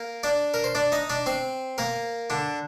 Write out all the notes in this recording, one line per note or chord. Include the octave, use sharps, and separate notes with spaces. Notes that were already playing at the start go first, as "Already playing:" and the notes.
Already playing: A#3 A#4
D4 D5
A#4
C5
D4 D5
D#4 D#5
D4 D5
C4 C5
A#3 A#4
D3 D4